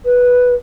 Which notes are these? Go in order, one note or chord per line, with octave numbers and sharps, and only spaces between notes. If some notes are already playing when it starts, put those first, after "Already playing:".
B4